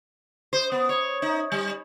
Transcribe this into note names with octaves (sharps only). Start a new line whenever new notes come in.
C5
B3
C#5
D#4
G3